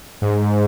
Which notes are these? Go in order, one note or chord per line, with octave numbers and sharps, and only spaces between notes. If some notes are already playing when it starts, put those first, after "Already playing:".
G#2